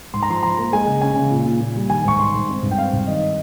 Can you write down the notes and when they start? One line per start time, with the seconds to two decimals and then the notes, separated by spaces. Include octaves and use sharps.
0.14 G#2 C6
0.23 A#5
0.29 F3 C6
0.43 F3 A#5
0.58 A#3
0.73 G#3 G#5
0.87 C#3
1.01 C#4 G#5
1.16 C#3
1.31 A#2
1.46 A#2
1.60 A#2
1.76 G3
1.90 D#3 G#5
2.05 G#2 C#6
2.19 G#2 C6
2.34 G#2
2.49 C4
2.63 G2
2.71 G5
2.78 C4 F5
2.93 G2
3.07 D#3 D#5